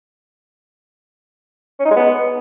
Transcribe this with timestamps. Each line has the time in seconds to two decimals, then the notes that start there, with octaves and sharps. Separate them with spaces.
1.80 C#4
1.85 D#4
1.91 G#3
1.96 B3